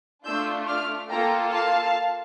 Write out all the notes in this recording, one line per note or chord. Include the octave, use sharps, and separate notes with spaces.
A3 D4 F4 E6 G6
D6 F6
A#3 F4 A4 G5 A#5
F5 A5